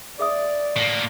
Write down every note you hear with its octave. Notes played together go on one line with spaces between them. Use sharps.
G#4 D5 E5 D#6
A2 A#3